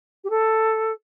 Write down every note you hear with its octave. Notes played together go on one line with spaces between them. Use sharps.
G4
A4